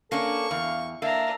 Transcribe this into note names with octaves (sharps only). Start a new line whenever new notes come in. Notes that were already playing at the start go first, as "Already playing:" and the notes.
A#3 C#4 D4 A4 C#6
E2 F5
A#3 D4 E5 A#5